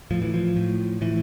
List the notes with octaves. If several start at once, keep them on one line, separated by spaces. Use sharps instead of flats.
A2 F3
E3
F3
A2
A2 E3